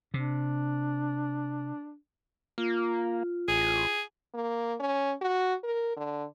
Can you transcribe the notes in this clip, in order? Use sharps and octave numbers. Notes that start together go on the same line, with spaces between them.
C3 D4
A#3 F4
A1 G#4
A#3
C#4
F#4
A#4
D3